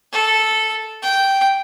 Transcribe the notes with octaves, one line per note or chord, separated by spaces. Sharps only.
A4
G5